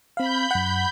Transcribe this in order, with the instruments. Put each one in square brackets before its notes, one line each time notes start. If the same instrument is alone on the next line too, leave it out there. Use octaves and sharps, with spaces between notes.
[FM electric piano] C4 F5 [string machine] B5 G6
[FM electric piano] F#2 F#5